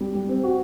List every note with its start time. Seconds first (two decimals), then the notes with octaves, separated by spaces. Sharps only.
0.01 G3
0.15 G3
0.29 C4
0.44 F#4